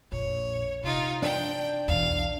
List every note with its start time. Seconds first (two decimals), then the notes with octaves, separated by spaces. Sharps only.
0.12 A#1 F2 C#5
0.84 C3 D#4 F4
1.22 D4 G5
1.88 B1 E2 F5